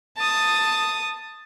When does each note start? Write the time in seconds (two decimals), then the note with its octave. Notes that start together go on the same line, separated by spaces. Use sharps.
0.18 A5 D#6